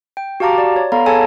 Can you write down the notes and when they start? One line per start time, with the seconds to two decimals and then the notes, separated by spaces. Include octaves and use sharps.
0.17 G5
0.40 F#4 G4 F5 A5 A#5 D6
0.58 D5
0.76 C#5
0.92 B3 A4 F5 A#5 B5
1.06 G#4 A4 C#5 G#5 A5 E6